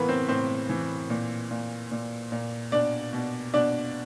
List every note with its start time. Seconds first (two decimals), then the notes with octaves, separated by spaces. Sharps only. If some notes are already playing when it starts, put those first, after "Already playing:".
Already playing: A2 E3 A#3 B3 A#4 B4
0.09 C4 C5
0.28 A2 C4 C5
0.69 E3
1.10 A#2
1.51 A#2
1.91 A#2
2.32 A#2
2.72 B2 D4 D5
3.13 B2
3.54 B2 D4 D5